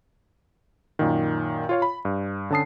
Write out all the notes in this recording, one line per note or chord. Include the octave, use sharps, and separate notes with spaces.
F#2 A#2 D#3
F4 C#5 F5
B5
G2
D3 C#4 A5 D#6 C7